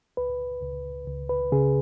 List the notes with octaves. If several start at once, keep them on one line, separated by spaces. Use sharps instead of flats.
C#2 B4
C#2
C#2
B4
C#3 G#4